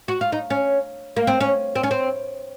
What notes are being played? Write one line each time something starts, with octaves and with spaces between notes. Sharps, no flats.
F#4
F4
D#4
C#4
A#3
C4
C#4
C4
C#4
C4